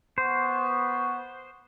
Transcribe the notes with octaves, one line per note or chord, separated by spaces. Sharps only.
B3 C5 C#6